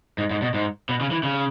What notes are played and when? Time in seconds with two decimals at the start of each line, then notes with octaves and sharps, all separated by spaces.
0.18 G#2
0.31 G#2
0.42 B2
0.54 G#2
0.89 B2
1.01 C#3
1.11 E3
1.23 C#3